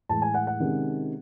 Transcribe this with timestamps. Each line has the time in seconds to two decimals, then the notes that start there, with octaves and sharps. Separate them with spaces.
0.09 A2 E3 G#3 A5
0.22 G#5
0.34 F#5
0.47 F#5
0.60 C3 D#3 G#3 C#4